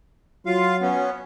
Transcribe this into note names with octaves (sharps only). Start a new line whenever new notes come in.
F#3 F4 F5
B3 C#4